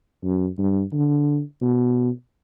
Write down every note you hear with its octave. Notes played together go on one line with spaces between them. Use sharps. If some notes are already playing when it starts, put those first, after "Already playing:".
F#2
G2
D3
B2